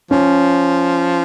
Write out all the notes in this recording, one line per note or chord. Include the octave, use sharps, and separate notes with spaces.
F3 C#4